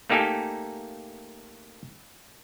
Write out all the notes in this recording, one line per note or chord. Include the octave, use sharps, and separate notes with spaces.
A3 A#3 D#4 G4 A4 G#5